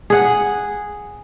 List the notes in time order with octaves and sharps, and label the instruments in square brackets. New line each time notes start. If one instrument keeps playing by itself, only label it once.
[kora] G#4 F#5